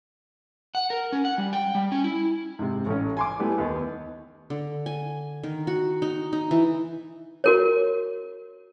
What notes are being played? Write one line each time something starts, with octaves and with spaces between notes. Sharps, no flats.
F#5
A#4
C#4
F#5
G3
G5
G3
C#4
E4
G#2 C3
A1 C#4
G#5 C6 D6
G3 A3 B3 E4
D#2 B3
D3
G#5
D#3
F#4
D#4
D#4
E3
F#4 A#4 C#5